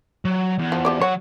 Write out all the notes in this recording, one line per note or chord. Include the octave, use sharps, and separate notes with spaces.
F#3
E2
F3
F3 G4 D5
F#3 C#5 F#5